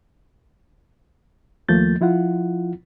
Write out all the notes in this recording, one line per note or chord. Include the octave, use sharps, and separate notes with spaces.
D#2 F3 A3 A#3 G6 A6
F3 E4 F4 F#5